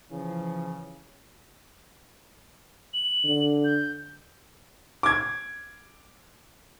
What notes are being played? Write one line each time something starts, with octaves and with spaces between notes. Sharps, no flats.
C#3 E3 F3
F#7
D3
G6
D6 G#6